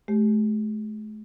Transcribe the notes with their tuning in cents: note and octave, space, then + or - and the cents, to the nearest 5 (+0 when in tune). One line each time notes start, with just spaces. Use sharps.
A3 -45 G4 +0